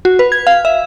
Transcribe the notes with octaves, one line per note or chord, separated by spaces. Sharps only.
F#4
B4
G#6
F5
E5